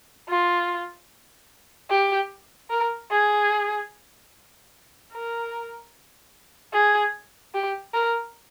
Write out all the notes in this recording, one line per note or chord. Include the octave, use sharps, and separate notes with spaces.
F4
G4
A#4
G#4
A#4
G#4
G4
A#4